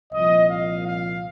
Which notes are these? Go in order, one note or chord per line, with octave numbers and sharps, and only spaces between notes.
C2 A#2 F3 D#5
F5
F5